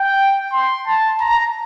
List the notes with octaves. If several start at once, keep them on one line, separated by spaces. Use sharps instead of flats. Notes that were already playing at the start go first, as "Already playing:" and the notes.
Already playing: G5
C6
A5
A#5